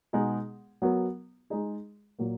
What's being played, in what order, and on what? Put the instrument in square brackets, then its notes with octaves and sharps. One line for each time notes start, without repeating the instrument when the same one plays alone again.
[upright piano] B2 G#3 B3 D#4 G#4
F#3 B3 F#4 A#4
G#3 D#4 G#4
A#2 F#3 A#3